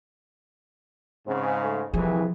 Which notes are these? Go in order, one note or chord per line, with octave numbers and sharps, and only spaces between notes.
G#2 C#3 C4
A3
C2 F2 E3 F3 G#4